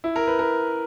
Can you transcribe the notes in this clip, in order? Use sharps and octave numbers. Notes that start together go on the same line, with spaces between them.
E4
A#4
B4
A#4